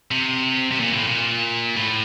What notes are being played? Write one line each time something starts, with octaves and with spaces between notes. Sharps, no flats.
C3
C3
A#2
A2
A#2
A2